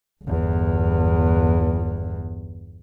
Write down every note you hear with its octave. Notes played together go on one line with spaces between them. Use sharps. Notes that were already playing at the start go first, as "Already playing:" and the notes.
G1 E2